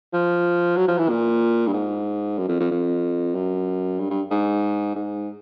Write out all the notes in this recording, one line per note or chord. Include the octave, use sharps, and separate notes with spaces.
F3
F#3
F3
E3
A#2
G2
G#2
F#2
F2
F2
F2
F#2
G2
G2
G#2
G#2